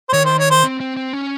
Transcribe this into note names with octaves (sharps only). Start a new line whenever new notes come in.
C5
D#3 C#5
C5
C#5
C5
C4
C4
C4
C#4